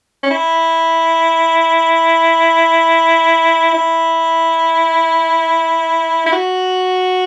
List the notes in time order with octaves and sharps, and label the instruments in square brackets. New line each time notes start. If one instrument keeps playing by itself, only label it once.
[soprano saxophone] C#4
E4
E4
E4
F#4